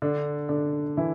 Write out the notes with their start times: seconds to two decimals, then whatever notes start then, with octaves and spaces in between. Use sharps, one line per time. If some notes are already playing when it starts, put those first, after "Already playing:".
0.02 D3 D4
0.49 D3 D4
0.97 E3 E4